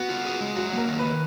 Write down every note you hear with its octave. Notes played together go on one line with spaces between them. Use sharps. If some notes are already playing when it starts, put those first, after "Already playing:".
Already playing: B3 F#4
F4
G#4
G#3
F#3 F#4
A#3 A#4
D#3
B4
D#3